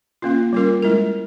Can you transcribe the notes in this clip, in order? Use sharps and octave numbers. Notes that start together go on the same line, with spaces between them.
A#3 C#4 F4
G3 C#4 F4 A#4
G#3 E4 A#4